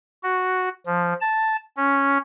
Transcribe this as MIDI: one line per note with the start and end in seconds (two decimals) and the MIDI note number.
0.24 0.69 66
0.86 1.13 53
1.21 1.56 81
1.77 2.18 61